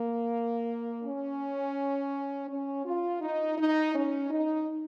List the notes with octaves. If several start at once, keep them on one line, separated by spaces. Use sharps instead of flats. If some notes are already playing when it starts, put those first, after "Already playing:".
Already playing: A#3
C#4
C#4
F4
D#4
D#4
C#4
D#4